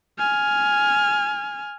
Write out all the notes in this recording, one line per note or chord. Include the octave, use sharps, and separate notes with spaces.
G#5 F6